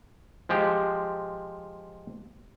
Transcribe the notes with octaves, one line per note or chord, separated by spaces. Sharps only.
F3 G#3 G4